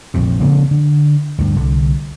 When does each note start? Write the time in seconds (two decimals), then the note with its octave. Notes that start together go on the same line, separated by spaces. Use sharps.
0.14 A#1 F2 A2 C3
0.41 C#3 F3 A#3 C4
0.71 D3
1.38 D2 G2
1.57 C2 D3